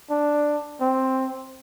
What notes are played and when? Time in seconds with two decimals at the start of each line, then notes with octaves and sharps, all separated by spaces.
0.10 D4
0.81 C4